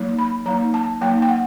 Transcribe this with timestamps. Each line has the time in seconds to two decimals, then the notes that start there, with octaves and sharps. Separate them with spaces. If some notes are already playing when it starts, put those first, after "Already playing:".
Already playing: F#3 A#3 D#4
0.19 B5
0.46 F#3 A#3 D#4 A#5
0.74 A5
1.01 F#3 A#3 D#4 G5
1.22 G5
1.29 F#5